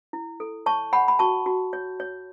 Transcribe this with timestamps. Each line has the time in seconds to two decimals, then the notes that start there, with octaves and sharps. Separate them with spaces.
0.13 E4
0.40 A4
0.66 C#5 A5 C#6
0.93 C#5 F#5 B5
1.08 B5
1.19 F#4 A5 C#6
1.46 F#4
1.73 C#5
2.00 C#5